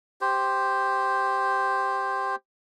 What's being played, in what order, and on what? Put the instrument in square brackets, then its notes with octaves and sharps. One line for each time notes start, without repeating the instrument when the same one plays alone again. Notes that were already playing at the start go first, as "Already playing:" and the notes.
[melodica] G4 C5